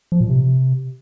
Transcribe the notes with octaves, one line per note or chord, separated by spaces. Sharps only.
F3
A#2
C3